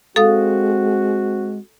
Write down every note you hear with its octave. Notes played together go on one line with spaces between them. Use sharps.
G#3 C4 F#4 A4 F5 D#6